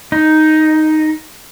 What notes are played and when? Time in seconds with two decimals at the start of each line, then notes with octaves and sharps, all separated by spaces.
0.12 D#4